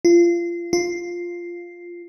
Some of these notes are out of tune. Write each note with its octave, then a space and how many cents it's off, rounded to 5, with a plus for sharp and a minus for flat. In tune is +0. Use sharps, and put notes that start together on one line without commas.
F4 -25
F4 +0